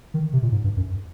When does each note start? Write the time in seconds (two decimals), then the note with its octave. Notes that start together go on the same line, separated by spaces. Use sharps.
0.14 D#3
0.33 C3
0.43 A#2
0.52 G#2
0.64 G2
0.77 F#2